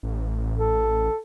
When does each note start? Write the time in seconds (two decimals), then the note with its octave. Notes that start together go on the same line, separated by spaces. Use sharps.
0.03 A1
0.58 A4